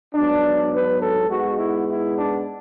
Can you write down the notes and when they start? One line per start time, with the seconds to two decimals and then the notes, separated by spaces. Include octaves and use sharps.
0.15 G#2 F#3 B3 D4
0.73 B4
1.02 A4
1.29 G#2 G#3 B3 F#4
1.59 E4
1.87 E4
2.16 D4